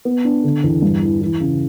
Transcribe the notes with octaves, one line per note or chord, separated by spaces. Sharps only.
B3
D4
D3
E2
G2
E3
E3
C#3